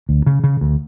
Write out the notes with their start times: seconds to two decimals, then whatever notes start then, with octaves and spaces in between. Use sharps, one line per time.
0.09 D2
0.26 C#3
0.44 C#3
0.61 D2